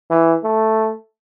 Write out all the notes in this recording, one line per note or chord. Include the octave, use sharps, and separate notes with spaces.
E3
A3